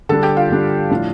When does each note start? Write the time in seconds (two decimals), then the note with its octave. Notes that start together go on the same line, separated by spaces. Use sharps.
0.09 D3 G3 D4 A4 A5
0.23 G4 G5
0.37 F4 F5
0.50 D3 G3 D4
0.90 A2 F3 D4